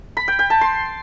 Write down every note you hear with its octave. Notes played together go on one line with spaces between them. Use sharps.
B5
G5
G5
A5
C6